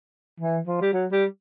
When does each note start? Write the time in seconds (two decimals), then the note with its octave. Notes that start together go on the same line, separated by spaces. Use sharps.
0.41 E3
0.67 F3
0.81 G3
0.93 F#3
1.12 G3